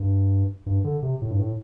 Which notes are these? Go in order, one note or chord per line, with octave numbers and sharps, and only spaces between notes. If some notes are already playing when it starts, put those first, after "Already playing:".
Already playing: G2
G2
D3
C3
A2
G2
A2